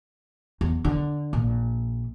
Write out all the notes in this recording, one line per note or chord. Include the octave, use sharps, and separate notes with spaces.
E2
D3
A#1